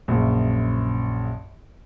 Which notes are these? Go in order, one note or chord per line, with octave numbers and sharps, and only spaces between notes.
A#1 F#2 C#3